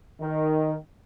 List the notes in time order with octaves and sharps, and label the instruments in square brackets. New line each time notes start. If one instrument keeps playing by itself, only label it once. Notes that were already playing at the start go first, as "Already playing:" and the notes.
[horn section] D#3